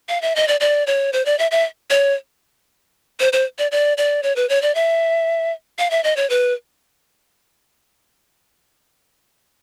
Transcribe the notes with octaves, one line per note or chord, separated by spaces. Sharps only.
F5
E5
D#5
D5
D5
C#5
C5
D5
E5
E5
C#5
C5
C5
D5
D5
D5
C#5
B4
C#5
D5
E5
F5
E5
D#5
C#5
B4